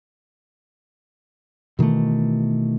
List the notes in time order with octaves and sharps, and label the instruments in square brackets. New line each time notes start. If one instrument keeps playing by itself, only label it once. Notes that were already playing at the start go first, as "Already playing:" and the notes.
[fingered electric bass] B2 D#3 E3 A3